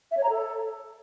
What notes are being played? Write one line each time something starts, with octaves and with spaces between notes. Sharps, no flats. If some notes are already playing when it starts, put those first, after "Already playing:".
E5
C#5
A#5
A4